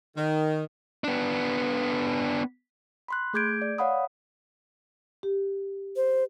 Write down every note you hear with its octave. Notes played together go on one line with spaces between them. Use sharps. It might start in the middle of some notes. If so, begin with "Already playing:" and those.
D#3
B3 D4
B5 C6 F#6
A3 G#4 D6 G6 G#6 D7
D5
C#5 F5 F#5 B5 D#6
G4
C5